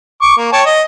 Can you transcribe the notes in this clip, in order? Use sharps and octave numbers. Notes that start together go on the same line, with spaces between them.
C#6 D6
A#3
C#5 G5 A5
D#5